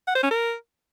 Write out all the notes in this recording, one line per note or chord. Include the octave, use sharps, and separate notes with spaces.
F#5
C5
C#4
A#4